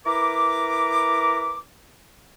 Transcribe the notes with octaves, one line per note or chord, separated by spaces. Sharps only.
E4 A#4 B4 A#5 D6